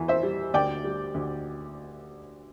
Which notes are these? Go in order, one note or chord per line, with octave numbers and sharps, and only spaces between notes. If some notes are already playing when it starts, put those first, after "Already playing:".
Already playing: E2 E3
C5 E5
G3
D2 D5 G5
G3
D2